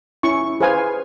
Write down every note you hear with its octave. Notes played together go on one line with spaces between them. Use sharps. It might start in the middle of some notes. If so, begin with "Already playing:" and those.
C#4 E4 C#6
G#4 B4 C5 F5 G#5